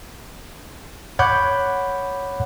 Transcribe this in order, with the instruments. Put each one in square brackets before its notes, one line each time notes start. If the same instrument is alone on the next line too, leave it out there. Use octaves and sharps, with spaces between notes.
[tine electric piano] C#5 F#5 B5 D6 F#6 G6